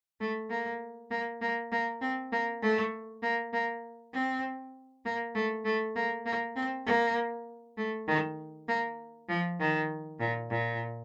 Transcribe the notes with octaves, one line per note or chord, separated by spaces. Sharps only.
A3
A#3
A#3
A#3
A#3
C4
A#3
A3
A#3
A#3
C4
A#3
A3
A3
A#3
A#3
C4
A#3
A3
D#3
A#3
F3
D#3
A#2
A#2